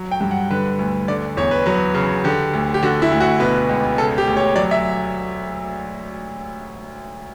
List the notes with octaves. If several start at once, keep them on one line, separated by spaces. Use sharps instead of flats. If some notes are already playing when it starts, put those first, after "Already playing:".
Already playing: F#3
G5
G2
F#5
D3 B4
D2
D3 D5
E2 C#5
B4
F#3 B4
C#3
D3 G4
D2
G4
D3 F#4
E4
D2
F#4
B2 B4
C#2
C#3 A4
G4
D2
C#5
F#3 D5
E5